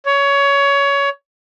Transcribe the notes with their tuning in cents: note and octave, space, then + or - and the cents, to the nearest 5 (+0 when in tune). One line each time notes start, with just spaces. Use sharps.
C#5 +20